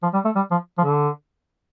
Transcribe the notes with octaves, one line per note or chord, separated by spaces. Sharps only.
F3
G3
A3
G3
F3
F3
D3